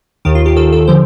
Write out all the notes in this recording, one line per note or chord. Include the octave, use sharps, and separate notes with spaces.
D#2 D#3 G4
F4
G4
D#2 D#3 A4
A4
D3 F3 C5